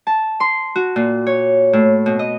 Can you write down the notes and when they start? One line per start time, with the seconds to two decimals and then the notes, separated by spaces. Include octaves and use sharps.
0.07 A5
0.40 C6
0.76 F#4
0.96 A#2
1.27 C#5
1.73 A2
2.06 B2
2.19 D#5